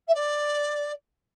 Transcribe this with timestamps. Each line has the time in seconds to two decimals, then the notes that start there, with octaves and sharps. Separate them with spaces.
0.08 E5
0.14 D5